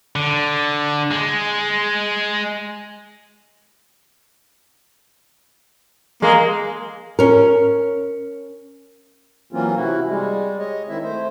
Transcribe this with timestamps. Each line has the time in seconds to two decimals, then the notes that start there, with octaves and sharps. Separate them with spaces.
0.16 D3
1.11 G#3
6.22 G#3 A#3
7.19 C#4 A#4
9.53 E3 F#3 A#3 C4 C#4 F4
9.76 C3 E4 F#4
10.07 G3 G#3
10.59 C#5 D#5
10.89 D#3 C4 E4 E5
11.04 A3 C5